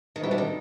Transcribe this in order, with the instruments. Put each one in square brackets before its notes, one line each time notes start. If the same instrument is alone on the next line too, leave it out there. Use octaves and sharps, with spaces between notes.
[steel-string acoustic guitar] D#3
[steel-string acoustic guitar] E3 [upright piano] G3 C4 D#4 F#4
[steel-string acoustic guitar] D3
D#3